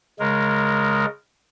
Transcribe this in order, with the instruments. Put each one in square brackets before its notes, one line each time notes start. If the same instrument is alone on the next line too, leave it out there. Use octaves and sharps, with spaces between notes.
[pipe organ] C#3 G#3 A#4